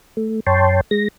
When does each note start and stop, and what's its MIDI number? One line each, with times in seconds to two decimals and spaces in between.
0.17 0.40 57
0.47 0.81 42
0.47 0.81 73
0.47 0.81 79
0.47 0.81 81
0.47 0.81 84
0.91 1.08 56
0.91 1.08 94